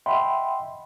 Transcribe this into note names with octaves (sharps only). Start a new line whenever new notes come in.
D#5 E5 F#5 G5 B5 C6